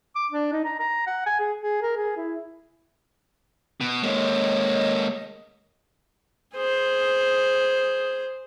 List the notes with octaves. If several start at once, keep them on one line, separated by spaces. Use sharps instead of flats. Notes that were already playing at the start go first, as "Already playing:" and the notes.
D6
D4
D#4
A#5
A#5
F#5
G#5
G#4
G#4
A#4
G#4
E4
B2
G#3 A#3 C#5 D#5
G#4 C5